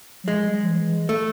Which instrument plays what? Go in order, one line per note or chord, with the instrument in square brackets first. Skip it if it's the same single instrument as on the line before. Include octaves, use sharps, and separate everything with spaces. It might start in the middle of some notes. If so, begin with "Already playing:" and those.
[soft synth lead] F#3
[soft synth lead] F3 [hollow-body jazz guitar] G#3
[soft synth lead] G3
F3
E3
[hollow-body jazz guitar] A3